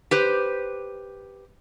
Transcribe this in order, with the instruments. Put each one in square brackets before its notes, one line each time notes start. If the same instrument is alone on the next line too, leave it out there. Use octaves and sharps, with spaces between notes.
[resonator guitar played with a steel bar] G4 B4 C5